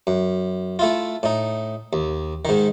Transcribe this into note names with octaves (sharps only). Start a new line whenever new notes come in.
F#2
A3 E4 F4
A2 D#4
D#2
G#2 D#3